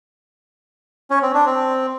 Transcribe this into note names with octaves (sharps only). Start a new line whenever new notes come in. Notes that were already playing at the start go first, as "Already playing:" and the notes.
C#4
C4
D4
C4